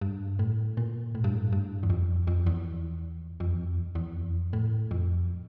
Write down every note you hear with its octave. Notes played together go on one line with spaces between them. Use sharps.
G2
A2
A#2
A2
G2
A2
G2
E2
F2
F2
E2
F2
E2
F2
E2
E2
F2
A2
F2